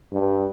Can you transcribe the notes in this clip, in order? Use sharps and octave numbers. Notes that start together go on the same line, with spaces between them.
G2